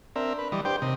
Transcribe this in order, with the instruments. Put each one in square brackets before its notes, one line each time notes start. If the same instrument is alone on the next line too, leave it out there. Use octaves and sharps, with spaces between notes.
[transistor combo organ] C4 A#4 E5 [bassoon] D4
[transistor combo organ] B4
E3 G3 D#5
[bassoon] G2 [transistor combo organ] G4 C5 G5
[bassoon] D#2 [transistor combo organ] C3 D#5